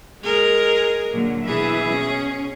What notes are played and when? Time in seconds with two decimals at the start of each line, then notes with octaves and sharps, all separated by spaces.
0.22 G#3 G#4 A#4
1.12 A#2 D3 F#3
1.44 B2 E3 G#4 E5
1.91 C#4